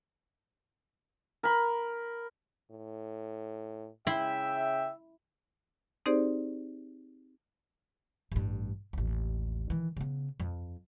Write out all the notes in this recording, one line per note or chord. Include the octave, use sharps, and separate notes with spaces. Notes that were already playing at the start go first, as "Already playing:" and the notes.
A#4 B5
A2
C#3 E4 E5 G5 B5 C6
C4 D#4 G4 G#4 C5 D5
A1 G2
A1 D#2
D#3 E3
C#3 B3
F2